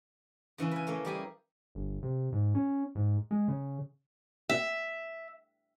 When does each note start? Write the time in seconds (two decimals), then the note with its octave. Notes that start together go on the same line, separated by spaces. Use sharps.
0.58 C#3 E3 C#4 E4
0.71 B4 G#5
0.87 A3 A#3 C#4
1.05 G3 G4 G#4 G#5
1.75 G1
2.03 C3
2.32 G#2
2.55 C#4
2.95 G#2
3.31 G#3
3.48 C#3
4.49 E5